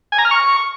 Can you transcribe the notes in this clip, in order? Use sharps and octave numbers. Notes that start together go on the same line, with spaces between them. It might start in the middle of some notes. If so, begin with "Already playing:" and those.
G#5
A#5
F6
C#6